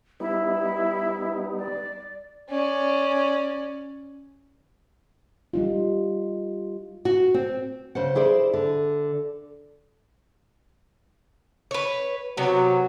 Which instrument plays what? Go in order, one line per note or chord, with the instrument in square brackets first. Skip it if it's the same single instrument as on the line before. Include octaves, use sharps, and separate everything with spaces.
[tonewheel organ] G3 B3 D#4 [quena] E4
[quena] D5
[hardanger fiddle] C#4 D5
[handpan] G3 D#4 F4
[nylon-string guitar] F#4
C4
C#3 C5 F#5
E4 G#4 C5 D5
D3
[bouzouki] B4 C#5
[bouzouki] C3 B3 [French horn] F#3